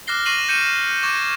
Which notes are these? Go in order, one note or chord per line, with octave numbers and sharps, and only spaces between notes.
D6 F6 F#6 A#6 C7 G7
C#6 A#6 C7 D#7 E7 F#7
G6 C#7 D#7 E7
C#6 D6 G#6 A#6 D#7